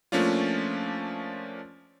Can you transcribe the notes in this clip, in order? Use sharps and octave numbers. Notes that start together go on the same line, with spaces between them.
F3 A3 A#3 C#4 D4 F4